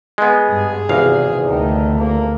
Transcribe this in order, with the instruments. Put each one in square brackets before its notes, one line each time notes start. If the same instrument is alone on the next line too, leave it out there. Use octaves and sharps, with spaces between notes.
[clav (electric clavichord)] G#3 B3
[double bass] G2 [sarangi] G#4
[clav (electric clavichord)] G#1 E2 F5 [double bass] C3
[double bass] D2 A3 [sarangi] D#3
[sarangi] A#3